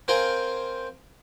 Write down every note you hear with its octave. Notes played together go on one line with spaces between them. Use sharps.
C4 A#4 C5 F5 G5 G#5